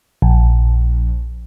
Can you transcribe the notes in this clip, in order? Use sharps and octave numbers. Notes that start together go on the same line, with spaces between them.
A#1